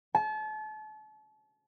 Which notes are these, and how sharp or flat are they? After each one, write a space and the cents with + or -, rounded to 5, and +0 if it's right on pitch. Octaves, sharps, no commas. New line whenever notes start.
A5 -35